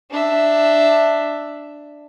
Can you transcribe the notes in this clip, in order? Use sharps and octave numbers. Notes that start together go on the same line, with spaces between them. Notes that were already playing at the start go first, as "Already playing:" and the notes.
D4 E5